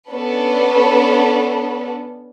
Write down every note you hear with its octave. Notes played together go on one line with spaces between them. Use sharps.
B3 C#4 D4 A4 B4